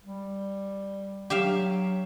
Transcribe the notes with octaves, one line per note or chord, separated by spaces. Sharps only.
G3
F#3 G4 E5 F5